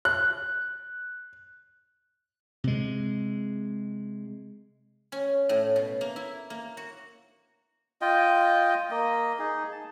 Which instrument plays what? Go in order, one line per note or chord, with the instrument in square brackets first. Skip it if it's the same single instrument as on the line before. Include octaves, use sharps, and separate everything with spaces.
[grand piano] F#6
[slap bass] C3 G#3
[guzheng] C#4
A2
B2
A#3
E4
A#3
F#4
[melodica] F4 D#5 G5
A#3 D#5
D#4 G#4
A5